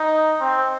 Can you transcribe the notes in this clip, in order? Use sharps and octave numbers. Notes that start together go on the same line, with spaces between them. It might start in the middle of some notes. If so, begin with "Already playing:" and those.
Already playing: D#4
C4